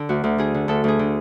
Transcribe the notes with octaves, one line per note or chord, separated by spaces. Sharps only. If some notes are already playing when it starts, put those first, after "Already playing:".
Already playing: D3
D2 F#4
D2
D3 G#4
D3
D2 A4
D2 G#4
D3